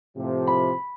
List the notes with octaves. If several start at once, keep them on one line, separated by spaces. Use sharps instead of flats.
A2 C3 F3
B5